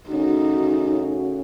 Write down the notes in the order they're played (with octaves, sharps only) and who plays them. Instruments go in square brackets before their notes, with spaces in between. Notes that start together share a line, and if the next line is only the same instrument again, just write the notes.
[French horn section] C#3 A3 C#4 F#4 [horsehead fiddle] D#4